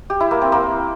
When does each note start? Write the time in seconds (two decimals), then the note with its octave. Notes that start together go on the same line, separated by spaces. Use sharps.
0.10 G4
0.20 E4
0.31 A#3
0.42 C4
0.52 A#3